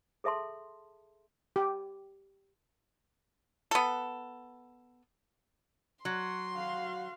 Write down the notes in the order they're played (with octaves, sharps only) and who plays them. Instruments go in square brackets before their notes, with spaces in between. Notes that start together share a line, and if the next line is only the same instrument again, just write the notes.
[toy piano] G#4 A4 E5 A5 C6
[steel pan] G4
[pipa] B3 A4
[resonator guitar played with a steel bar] F#3 [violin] C6
[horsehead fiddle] F#4 F5